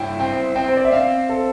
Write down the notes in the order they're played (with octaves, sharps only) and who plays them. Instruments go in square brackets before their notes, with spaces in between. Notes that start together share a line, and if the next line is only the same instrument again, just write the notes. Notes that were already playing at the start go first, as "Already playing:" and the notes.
Already playing: [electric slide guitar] G2 E4 [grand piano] G5
[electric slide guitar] C4 [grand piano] G5
[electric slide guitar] C4 [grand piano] G5
[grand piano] C5
D5
E5
[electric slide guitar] C4 [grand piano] F5
[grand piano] A4